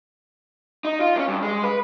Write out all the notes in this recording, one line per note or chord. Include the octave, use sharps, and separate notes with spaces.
D#4
F4
G3 C#4
G2
G#3
B4